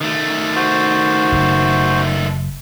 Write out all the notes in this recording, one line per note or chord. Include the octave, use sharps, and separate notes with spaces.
D#3 A3
F#4 C5
F#1